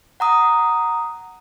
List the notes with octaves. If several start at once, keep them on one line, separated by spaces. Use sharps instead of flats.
F#5 A#5 D#6